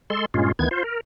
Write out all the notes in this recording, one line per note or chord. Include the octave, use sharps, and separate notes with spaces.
G#3 A4 C6
G2 A#2 G#3 C#4 F4
D2 D#3 E3 B3 G#6
F4 C5
A#4